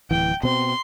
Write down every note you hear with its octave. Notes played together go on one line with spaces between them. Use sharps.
D1 E3 G5
B2 C4 C6